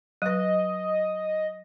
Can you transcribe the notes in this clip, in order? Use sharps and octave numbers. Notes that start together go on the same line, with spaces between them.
F#3 B4 D#5